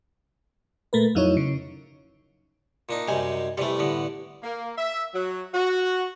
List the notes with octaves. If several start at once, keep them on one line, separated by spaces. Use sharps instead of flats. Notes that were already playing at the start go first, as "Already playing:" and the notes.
A#2 A3 A#4 B4
F2 F#3 D#4 E4 C#5
C#3
A#2 D4 D#4
F#2 C3 G3 D#4 G#5
C3 E3 G3 A3
A2 D3 B3
A#3
E5
F#3
F#4